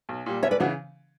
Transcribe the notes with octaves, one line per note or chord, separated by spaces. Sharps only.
B1
A#2 G3
F#1 C#5 E5
B4 D5
C#3 E3 D4 F#4